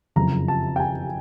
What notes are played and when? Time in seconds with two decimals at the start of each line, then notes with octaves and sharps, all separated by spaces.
0.16 F#1 F2 C#3 A#5
0.48 A5
0.76 G5
0.80 G#5